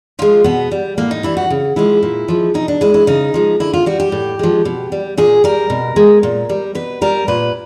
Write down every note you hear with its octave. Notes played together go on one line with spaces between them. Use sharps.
F3 G#3 F4
B2 B3
G3
A2 A#3
D#4
E3 G3 E4
F#4
C#3
F3 G#3 E4
A#2
F3 G#3
B2 D#4
D4
G#3 E4
E4
C#3 D#4
F3 G#3
D3 E4
F4
G3 F#4
G4
A2
F3 G#3
B2
G3
A#2 G#4
G3 A#4
B2
G#3
A#2
G3
B2 B4
G3 A#4
A#2 B4